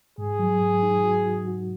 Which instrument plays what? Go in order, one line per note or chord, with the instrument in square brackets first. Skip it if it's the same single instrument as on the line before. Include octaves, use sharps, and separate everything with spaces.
[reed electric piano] G#2 [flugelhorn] G#4
[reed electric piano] F#3
G#2
D#4
F#4
F#4
F#4